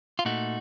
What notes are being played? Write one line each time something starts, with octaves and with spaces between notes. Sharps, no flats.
F4
A#2 A3 D#4 F#4